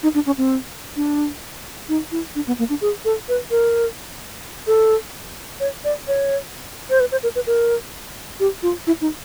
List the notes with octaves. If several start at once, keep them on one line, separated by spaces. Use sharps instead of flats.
D#4
D4
C#4
C4
D4
D#4
E4
D4
B3
A#3
D4
G#4
A4
B4
A#4
A4
C#5
D5
C#5
C5
B4
C5
A#4
B4
A#4
G4
F4
E4
D#4